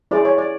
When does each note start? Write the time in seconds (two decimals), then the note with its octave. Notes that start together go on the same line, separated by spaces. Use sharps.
0.11 E4 G#4 C5 D5
0.25 C#5
0.38 D5